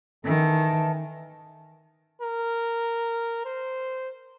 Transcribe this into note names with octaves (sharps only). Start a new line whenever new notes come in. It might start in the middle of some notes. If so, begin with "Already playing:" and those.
D#3 E3 A4
A#4
C5